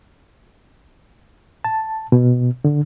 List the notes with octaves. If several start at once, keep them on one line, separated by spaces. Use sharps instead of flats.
A5
B2
D3